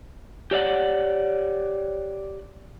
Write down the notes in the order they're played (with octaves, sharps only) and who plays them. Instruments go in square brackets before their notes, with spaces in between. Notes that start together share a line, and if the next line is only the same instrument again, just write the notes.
[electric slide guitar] G4 C#5 D5 F#5